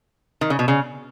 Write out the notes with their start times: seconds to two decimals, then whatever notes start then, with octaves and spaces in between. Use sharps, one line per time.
0.41 D#3
0.50 C#3
0.59 B2
0.68 C#3